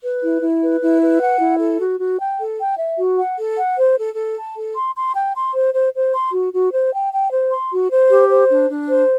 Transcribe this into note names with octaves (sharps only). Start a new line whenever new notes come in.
B4
E4
E4
B4
E4
B4
F#5
E4
A4
F#4
F#4
G5
A4
G5
E5
F#4
F#5
A4
F#5
C5
A4
A4
A5
A4
C6
C6
G5
C6
C5
C5
C5
C6
F#4
F#4
C5
G5
G5
C5
C6
F#4
C5
G4
C5
D4
D4
C5